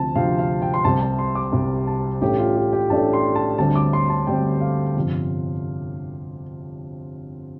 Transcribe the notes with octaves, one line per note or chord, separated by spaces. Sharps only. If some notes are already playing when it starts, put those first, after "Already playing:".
Already playing: D2 C3 F3 C4 A5
D2 C3 F3 C4 F5
F5
G5
C6
C2 C3 G3 C4 A5
A5
C6
D6
C2 C3 G3 C4
A5
A1 A2 A3 D4 G4
F4
G4
G4
A1 A2 A3 D4 A5
C6
A5
D2 D3 G3 C4 A5
D6
C6
A5
D2 D3 G3 C4 G5
F5
G1 F2 C3